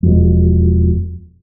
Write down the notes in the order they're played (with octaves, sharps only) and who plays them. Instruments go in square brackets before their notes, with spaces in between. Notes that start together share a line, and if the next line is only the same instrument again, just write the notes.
[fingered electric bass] E1 F2